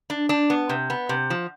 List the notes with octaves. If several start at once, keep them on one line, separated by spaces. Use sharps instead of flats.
D4
D4
B3
C3
B3
C3
F3